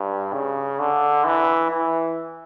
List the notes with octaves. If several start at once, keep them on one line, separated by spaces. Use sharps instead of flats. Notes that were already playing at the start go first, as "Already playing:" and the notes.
Already playing: G2
C#3
D3
E3
E3